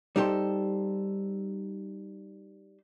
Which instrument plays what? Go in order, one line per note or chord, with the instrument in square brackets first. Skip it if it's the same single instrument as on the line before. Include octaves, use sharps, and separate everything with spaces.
[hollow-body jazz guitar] G3 D#4 G4 A4 C5